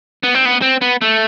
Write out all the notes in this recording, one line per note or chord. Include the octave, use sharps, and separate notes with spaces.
B3
C4
B3
C4
B3
A3